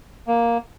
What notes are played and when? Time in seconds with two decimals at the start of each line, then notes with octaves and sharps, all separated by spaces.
0.28 A#3